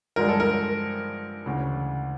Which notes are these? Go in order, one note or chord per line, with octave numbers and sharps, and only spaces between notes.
G2 D3 F3 G#3 A#4
A4
A#4
D2 C#3 E3